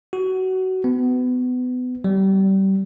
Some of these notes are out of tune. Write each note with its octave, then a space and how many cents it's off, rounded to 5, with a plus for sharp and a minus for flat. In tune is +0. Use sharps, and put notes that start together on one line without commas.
F#4 +20
B3 +25
G3 -25